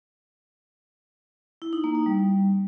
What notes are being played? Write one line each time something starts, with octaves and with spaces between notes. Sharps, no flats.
E4
D#4
A#3
D#4
G3